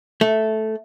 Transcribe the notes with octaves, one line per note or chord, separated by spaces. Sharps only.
A3